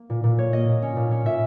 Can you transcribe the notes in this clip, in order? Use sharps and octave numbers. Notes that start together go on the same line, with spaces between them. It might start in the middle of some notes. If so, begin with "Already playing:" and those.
Already playing: A#3
A#2
A#2
A#3 C#5
A#3 D#5
A#2
C#4
A#2
C#4
A#2 E5